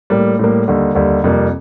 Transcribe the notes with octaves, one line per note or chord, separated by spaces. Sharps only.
A2 G3 A#3
A2 G3 A#3
D#2 D3 G3
D#2 D3 G3
F2 C3 G3 A#3